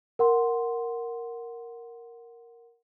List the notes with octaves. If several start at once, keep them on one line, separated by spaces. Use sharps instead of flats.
A#4 F#5 C6